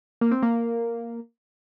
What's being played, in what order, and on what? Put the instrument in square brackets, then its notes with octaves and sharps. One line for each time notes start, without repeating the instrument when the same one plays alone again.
[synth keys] A#3
C4
A#3